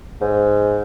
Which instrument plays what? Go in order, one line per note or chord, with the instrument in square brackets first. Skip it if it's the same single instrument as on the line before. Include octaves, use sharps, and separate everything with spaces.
[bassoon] G#2